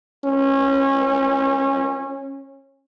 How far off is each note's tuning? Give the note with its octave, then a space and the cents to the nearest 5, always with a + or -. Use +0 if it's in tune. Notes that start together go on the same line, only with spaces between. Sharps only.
C#4 -25